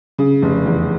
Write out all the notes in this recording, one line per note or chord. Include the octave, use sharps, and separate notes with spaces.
C#3
F1
E2